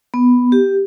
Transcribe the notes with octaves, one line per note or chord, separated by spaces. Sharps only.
B3
G4